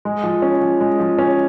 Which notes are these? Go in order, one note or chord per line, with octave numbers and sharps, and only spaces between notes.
G#3
F3
C#4
F3
G#3
F3
C#4